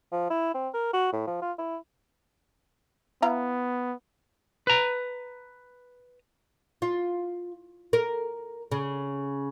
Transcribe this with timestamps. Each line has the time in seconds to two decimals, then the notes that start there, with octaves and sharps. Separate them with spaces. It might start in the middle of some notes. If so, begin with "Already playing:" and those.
0.12 F3
0.30 E4
0.54 C4
0.74 A#4
0.93 F#4
1.13 A2
1.27 F3
1.42 F4
1.58 E4
3.22 B3 E4 F5 A#5
4.67 B4 A#5
6.82 F4
7.93 A#4
8.72 C#3